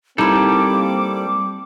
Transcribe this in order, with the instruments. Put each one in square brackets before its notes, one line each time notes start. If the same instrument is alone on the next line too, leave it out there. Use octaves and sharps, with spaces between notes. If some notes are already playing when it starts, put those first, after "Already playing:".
[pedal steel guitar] G3 A4 [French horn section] A#3 C4 [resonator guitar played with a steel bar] D#4 E4 [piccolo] D6